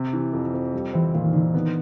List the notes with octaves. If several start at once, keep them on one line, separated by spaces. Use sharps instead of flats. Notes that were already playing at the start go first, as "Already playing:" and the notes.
Already playing: C3
E3
F2
F2
G3
E3 C4
A#2 D#3
D3 D#4
B3